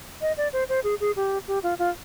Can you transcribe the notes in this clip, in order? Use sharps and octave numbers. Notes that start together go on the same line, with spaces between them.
D#5
D5
C5
C5
G#4
G#4
G4
G4
F4
F4